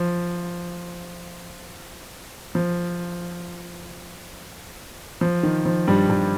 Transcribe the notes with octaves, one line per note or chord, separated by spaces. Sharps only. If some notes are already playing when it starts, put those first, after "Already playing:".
Already playing: F3
F3
F3
D#3
F3
G2 G3
G2 G3